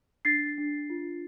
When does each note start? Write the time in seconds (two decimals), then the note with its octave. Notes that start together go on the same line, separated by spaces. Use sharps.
0.25 D4 A6 C7
0.58 D4
0.90 F4